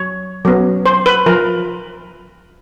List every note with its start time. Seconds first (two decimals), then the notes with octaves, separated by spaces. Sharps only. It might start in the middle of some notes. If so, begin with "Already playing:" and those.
Already playing: F#3 C#5
0.45 F#3 B3
0.86 C5
1.06 B4
1.26 F3 A#4